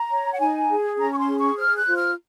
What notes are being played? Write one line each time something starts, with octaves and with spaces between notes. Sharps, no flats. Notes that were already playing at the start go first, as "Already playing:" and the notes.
Already playing: A#5
C#5
F#5
D#4 G#5
G#4
C#4 A#5
C#6
C6
G#4
C#6
C5 F6
F#6
F4
F6